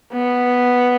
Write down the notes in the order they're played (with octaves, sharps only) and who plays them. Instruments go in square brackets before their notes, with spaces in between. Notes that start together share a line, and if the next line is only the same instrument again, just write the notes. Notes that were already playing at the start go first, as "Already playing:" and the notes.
[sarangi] B3